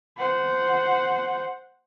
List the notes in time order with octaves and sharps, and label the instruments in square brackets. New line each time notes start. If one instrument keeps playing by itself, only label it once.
[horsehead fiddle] C5 F#5